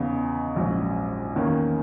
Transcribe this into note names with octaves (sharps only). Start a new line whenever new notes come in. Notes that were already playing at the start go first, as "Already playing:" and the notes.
Already playing: E2 C#3 E3 B3 D#4
A#1 G#2 F#3 C#4
E2 D#3 A#3 C#4